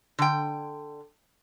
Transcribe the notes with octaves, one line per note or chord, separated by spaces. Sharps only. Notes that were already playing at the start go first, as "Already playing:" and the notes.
D3 G5